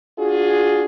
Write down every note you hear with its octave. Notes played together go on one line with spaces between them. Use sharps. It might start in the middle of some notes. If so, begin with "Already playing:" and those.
D4 F4 F#4 G#4